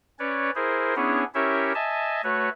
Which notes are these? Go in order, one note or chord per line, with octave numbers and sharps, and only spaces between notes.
C#4 B4 C#5 D5
E4 G#4 A#4 C5
B3 C#4 D4 E4 G#4 C#5
C#4 E4 G4 A#4 C#5 E5
D#5 E5 G#5 A5
A3 F#4 B4 C#5